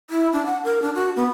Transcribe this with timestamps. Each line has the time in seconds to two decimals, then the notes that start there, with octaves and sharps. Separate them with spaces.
0.10 E4
0.33 D4
0.46 F#5
0.64 A#4
0.82 D4
0.95 F#4
1.16 B3